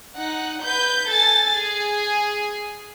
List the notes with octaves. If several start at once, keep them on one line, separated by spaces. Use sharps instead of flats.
D#4 F#5
B4 G6
A4 G#5 A6
G#4